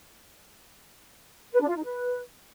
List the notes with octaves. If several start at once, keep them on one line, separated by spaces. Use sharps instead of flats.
B4
D4
F4
D#4
B4